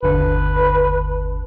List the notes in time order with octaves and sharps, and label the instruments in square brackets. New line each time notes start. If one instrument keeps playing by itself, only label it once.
[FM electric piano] G1 D#2 D3 [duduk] B4